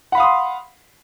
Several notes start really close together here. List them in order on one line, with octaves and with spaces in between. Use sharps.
F#5 B5 F5 D#6 C6